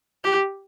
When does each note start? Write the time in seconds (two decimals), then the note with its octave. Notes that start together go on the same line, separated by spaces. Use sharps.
0.24 G4